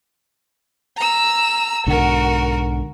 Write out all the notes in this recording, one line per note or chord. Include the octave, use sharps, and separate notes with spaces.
A#5 E6
B1 G#2 D3 F#4 A#4